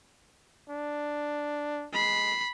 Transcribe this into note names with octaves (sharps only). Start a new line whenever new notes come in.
D4
G#3 B5 C7